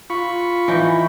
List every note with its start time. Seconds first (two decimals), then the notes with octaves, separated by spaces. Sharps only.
0.10 F4 B5 C#6
0.68 E3 D#4 G5